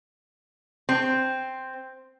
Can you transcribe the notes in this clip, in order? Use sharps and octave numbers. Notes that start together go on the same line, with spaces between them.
C4